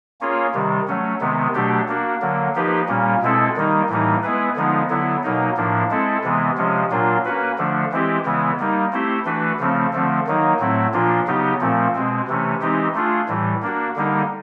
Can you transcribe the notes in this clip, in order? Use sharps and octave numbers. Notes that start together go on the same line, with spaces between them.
A#3 C#4 F4 G#4 C#5
C3 D#3 G3
F#3 A3 C#4
C3 D#3 G#3 B3
B2 F#3 A3 D4 G4
A#3 D4 F#4
D3 F#3 A#3
F3 A#3 D#4 G4 B4
A#2 G3 A#3 C#4
B2 G#3 C4 E4 A4
D#3 G3 A#3 D#4
A2 E3 G3 A#3 D#4
G#3 B3 E4 G#4 B4
D3 F3 G#3 B3 D#4
D3 F#3 B3 E4
B2 F#3 A#3 D#4
A2 F3 A#3 D4
G#3 C4 E4 A4
C3 E3 G#3 B3
C3 F3 G#3 C#4
A#2 F#3 A#3 D4 F4
A#3 C#4 F#4 B4
D3 F3 A3 D4
E3 G#3 C4 E4 G4
C#3 E3 G#3 B3 E4
G3 A#3 D#4
A3 C4 E4 G4 C5
E3 A3 D4 F#4 B4
C#3 F3 A3 C4
D3 F3 A3 C4
D#3 F#3 A#3 D#4
A2 F#3 A3 C4 E4
A#2 F3 A#3 D4 F4
C#3 F#3 B3 D#4 G4
A#2 F3 A3 C4
B2 G#3 C4
C3 E3 A3 C#4
E3 G#3 C4 D#4 G4
A3 D4 F4 G#4
A2 E3 G3
A#3 D4 F#4
D3 G3 A#3 D#4